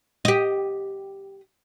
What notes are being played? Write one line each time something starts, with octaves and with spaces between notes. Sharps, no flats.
G4 D#5